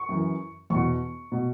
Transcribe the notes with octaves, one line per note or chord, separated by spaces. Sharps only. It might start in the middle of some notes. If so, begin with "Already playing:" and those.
Already playing: C#6
F#2 E3
E2 B2 C#6
B2